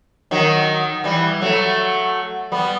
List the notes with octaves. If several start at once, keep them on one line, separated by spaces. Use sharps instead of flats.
D#3 F#3
E3 G3
F#3 A3
G3 B3